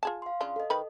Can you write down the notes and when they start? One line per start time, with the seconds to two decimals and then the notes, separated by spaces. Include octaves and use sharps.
0.03 F4 G#4 A5
0.22 F5 C6
0.41 C#3 D4 F4
0.56 A4 D#5
0.70 D#3 B4 B5